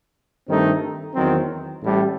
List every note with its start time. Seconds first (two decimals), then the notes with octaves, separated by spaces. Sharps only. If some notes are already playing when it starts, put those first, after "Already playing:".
0.48 G2 D#3 A3 C4 D#4
1.15 E2 D#3 F#3 C4
1.81 A1 A2 G3